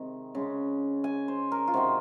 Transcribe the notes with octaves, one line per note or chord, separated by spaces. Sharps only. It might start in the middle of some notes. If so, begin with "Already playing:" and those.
Already playing: C3 D#3 G#3
C#3 G#3 C#4
G#5
C5
A#4
F4
C3 D#3 G#3 C4 F#4